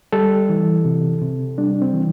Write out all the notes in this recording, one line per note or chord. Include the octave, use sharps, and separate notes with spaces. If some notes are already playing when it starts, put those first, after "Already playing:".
G3 A4
E3
C3
C3
G3 D4
C4
E3